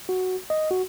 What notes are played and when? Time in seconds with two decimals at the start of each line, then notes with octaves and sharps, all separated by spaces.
0.09 F#4
0.50 D#5
0.71 F#4